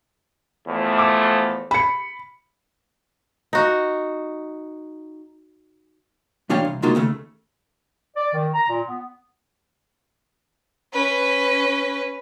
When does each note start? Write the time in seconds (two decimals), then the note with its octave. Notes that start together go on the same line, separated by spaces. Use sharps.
0.67 E2 F3 A3
0.98 D6
1.71 B5 C#7
3.53 D#4 F#4
6.49 B2 E3 D4 C#5 F5 G5
6.65 C2
6.82 C3 G#3 A#3 D#4 F4 F#4
6.95 D#2 C#3 A3
8.16 D5
8.34 D#3
8.54 A#5
8.68 A#2
8.87 B3
10.93 C#4 B4